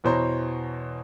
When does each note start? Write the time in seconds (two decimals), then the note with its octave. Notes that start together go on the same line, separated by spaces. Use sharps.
0.04 E2 B2 E3 C5 C#5 A#5